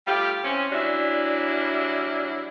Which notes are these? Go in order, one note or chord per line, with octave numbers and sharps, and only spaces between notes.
G3 A3 F4 G4
E3 C4 C#4
E3 F#3 G3 D4 E4